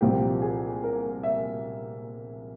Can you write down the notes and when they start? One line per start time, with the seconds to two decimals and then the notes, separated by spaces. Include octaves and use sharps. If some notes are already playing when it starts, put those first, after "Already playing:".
0.01 C2 A#2 F3 G4
0.42 G#4
0.84 A#4
1.23 E5